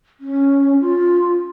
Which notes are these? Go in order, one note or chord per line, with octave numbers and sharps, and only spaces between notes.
C#4
F4